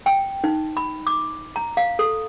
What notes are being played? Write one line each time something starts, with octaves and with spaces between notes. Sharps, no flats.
G5
D#4
B5
D6
A#5
F5
A4